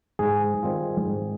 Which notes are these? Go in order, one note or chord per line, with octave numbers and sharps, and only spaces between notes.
G#2 G#4
D#3 G3 C4 F4
G#2